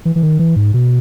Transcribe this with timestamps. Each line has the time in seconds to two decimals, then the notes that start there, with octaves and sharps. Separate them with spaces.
0.05 E3
0.16 E3
0.22 D#3
0.39 E3
0.56 G#2
0.74 B2